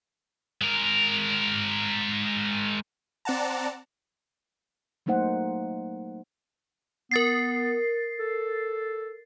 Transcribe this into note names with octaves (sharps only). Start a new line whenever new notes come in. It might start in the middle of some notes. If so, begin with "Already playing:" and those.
G#3 A#4
C4 D5 F#5 A5 A#5
F#3 A3 A#3 D#4 C5 F#5
B3 A#4 A6 C7
A4